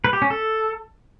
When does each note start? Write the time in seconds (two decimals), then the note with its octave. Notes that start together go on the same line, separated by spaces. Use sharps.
0.04 B4
0.13 G4
0.22 C#4
0.30 A4